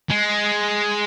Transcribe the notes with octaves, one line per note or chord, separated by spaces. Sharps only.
G#3